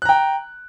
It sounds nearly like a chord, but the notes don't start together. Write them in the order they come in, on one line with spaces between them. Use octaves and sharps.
F#6 A#5 G5